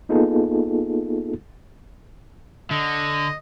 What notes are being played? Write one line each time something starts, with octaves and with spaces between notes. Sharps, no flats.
A#3 B3 D#4 F4 G#4 A4
D3 D#5